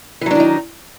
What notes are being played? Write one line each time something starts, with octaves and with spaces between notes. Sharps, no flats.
D#3 E3 F#3 D4 D#4